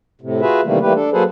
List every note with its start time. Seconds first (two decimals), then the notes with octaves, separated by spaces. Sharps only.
0.21 A2 C3
0.41 F4 F#4 G#4 B4 E5
0.65 C3 D#3 E3 G3 A3 A#3
0.82 E3 G3 A3 A#3 G4 B4
0.95 D4 A4
1.13 F#3 A#3 G#4 A4 B4 C5